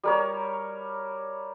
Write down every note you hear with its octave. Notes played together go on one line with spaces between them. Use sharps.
G3 A#4 C#5